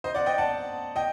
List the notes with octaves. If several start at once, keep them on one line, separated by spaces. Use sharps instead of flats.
C5 D#5
D5 F#5
D#5 G5
F#5 A5
D#5 G5